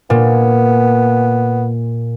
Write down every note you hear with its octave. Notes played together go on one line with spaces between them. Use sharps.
A#2 B3